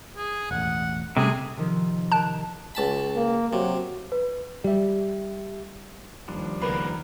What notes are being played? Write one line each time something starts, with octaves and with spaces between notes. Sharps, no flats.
G#4
E1 A1 F#5
C3 G3 A3 C#4 G#4
C3 D#3 F3
D#3 A5 F#6 D7
C#2 A5 B5
A#3
C3 F#3
B4
G3 G4 E5
D#2 F3 G3 D4
C#2 D#3 A#3 B3 A#4 B4